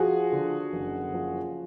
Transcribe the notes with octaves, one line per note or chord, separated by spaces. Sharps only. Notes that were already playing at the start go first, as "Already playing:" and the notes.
Already playing: F3 F#4 G#4
D3
F#1
F3